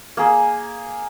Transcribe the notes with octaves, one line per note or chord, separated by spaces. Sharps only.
A#3 G#4